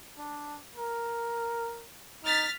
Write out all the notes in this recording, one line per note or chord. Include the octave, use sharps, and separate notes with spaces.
D4
A#4
D#4 F6 A6 B6